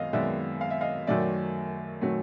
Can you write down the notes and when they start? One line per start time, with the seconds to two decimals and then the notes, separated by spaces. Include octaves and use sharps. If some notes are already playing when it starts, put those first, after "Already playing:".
Already playing: F#2 D#3 G#3 B3 D#5 F5
0.13 F#2 D#3 G#3 B3 D5 E5
0.61 F5
0.70 E5
0.81 D#5 F5
1.07 F#2 D#3 F#3 A3 D5 E5
2.01 D#3 F#3 A3